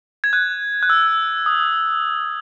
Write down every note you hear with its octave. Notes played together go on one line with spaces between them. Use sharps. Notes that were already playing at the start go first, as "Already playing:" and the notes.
G#6
F#6
F#6
E6
D#6